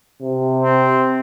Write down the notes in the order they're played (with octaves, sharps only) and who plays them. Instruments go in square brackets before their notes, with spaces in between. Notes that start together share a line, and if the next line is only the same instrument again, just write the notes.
[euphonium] C3
[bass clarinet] C4